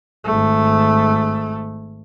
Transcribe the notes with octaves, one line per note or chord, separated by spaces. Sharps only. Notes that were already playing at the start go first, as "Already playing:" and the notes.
G#1 A3